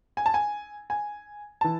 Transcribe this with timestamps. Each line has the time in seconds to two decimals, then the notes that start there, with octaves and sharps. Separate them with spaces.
0.17 G#5
0.26 A5
0.34 G#5
0.90 G#5
1.61 E3 A5